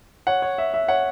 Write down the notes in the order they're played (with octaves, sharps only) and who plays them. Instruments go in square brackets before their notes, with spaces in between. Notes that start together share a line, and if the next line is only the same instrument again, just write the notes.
[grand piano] C#5 F#5
C#5
E5
E5
C#5 F#5